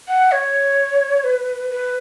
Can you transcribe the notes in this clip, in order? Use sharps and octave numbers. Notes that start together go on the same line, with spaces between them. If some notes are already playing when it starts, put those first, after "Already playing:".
F#5
C#5
B4
B4